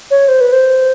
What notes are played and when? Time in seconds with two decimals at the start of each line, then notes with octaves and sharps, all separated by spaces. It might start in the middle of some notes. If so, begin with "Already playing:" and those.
0.11 C#5
0.28 C5
0.41 B4
0.52 C5